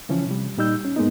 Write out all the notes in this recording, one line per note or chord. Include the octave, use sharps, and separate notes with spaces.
C#3 E3 F3 C#4
C3 G3
A#2 G3 D#4 E6 G6
C#4
G#2 G#3 A#3 B3 D#4